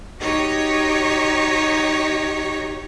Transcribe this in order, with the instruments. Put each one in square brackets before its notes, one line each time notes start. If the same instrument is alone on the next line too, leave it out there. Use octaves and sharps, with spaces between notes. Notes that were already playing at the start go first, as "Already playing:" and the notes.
[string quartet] D#4 F#4 G4 C#5 A#5 C#6